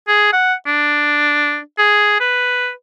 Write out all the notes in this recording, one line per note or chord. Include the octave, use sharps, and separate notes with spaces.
G#4
F#5
D4
G#4
B4